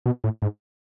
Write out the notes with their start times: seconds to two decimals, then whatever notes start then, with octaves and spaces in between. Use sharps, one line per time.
0.06 B2
0.24 A2
0.42 G#2